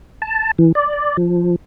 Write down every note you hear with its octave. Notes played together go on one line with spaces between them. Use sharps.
A5
E3
D5
F3